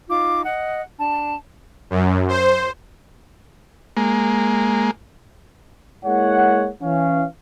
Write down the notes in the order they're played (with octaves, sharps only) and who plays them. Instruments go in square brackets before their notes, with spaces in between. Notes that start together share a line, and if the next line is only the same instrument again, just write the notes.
[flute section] D#4 F4 D6
D#5 F#5
D4 A5
[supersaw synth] F#2
C5
[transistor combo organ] G#3 A#3
[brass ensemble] G#3 A#3 E4 C#5 F#5
E3 C#4 F5